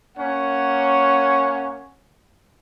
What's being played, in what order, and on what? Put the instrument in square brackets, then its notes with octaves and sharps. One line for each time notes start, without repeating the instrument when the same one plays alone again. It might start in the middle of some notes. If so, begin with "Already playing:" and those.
[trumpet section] A#3 C#4 C#5 F#5